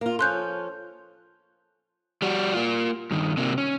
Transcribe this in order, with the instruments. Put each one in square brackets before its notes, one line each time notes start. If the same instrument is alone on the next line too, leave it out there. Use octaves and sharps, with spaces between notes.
[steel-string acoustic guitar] A#3 F4
[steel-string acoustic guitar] F3 C#4 A4 [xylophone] C6 F#6 G6
[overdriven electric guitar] G3 F#4
A#3 F4
G2 D#3
C3 A#3
C#4